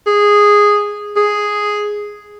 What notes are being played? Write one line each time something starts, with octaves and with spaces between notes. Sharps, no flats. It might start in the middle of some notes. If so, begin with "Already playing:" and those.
G#4
G#4